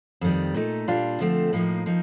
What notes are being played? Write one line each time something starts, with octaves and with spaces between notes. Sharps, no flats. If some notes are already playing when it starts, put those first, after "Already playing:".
F2 D#3 G3
A#2 A3 D#4
A#2 G3 D4 F4
D3 F3 A3 C4
A2 F3 A#3 D#4
F3 A#3 D#4